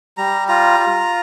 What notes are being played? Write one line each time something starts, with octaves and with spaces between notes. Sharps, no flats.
G3 A#5
F4 A#5
F4